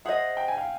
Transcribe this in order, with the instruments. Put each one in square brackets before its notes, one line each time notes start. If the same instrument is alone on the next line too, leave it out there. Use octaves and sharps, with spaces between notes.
[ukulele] G#4 C5 D#5 [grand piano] E5 F#5
[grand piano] G5
G#5
F5 G5